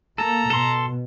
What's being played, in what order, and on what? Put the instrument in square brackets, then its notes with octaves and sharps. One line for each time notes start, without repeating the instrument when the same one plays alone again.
[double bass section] A#3 [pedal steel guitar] A4 [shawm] A#5
[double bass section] B2 [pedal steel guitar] A4 C6